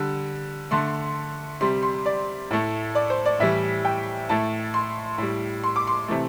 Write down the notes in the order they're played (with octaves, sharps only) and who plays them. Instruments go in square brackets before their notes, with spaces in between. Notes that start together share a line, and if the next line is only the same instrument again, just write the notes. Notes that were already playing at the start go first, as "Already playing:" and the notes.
Already playing: [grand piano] D3 G3
D3 A3 C6
C3 G3 C6
C6
D5
A2 A3
D5
C5
D5
A2 E3 G3 E5
G5
A2 A3 A5
C6
A2 G3
C6
D6
C6
C3 E3 A3